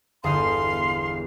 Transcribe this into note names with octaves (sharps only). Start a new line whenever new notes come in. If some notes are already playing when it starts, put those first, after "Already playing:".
G1 E2 F5 C6 D#6